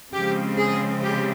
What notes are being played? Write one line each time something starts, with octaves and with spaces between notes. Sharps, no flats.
C#3 F3 G#3 C4 G4
G#4
G4